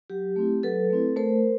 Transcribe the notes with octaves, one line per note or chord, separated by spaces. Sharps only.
F#3 G4
A3 C4 E4
F#3 A4 B4
A3 C4 E4
A3 A#4 C5